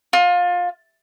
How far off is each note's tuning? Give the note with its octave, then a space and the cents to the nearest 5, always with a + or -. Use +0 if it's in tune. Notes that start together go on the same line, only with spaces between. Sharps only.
F4 +25